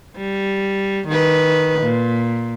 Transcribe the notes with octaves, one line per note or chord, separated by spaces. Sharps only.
G3
D#3 B4
A#2